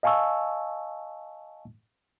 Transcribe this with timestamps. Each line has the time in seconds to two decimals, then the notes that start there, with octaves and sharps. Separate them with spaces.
0.03 D#5 F5 G#5 A5 C#6 E6